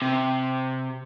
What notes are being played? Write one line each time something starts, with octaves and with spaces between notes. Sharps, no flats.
C3